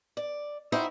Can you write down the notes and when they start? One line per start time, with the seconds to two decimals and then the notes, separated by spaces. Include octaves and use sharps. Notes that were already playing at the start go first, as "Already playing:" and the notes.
0.17 D5
0.72 D#4 E4 F#4 C5 E5 G5